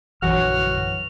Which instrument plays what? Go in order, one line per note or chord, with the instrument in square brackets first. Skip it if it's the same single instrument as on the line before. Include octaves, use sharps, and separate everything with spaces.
[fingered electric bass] A#1 F#2 D3 [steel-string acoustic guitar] E3 F#3 C#5 [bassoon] F#4 [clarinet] F6